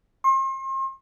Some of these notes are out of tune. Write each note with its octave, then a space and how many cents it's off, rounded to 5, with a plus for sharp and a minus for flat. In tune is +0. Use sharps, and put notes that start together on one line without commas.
C6 +40